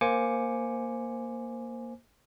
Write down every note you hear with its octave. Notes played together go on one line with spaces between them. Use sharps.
A#3 C5 G#5 D6 C#7